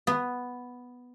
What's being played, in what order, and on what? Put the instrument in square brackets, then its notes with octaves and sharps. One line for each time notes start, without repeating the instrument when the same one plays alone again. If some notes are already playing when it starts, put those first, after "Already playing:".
[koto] B3